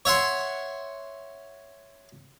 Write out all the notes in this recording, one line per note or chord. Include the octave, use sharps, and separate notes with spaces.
C#5 E5 F#5 C6